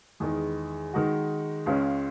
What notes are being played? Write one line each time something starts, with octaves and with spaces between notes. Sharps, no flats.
E2 D#3 G#3
D#3 G#3 D#4 F#4
C#2 C#3 G#3 C#4